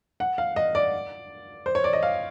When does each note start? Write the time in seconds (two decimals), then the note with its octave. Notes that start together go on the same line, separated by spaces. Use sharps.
0.20 F#5
0.38 F5
0.56 D#5
0.75 D5
1.66 C5
1.75 C#5
1.84 D5
1.93 D#5
2.03 F5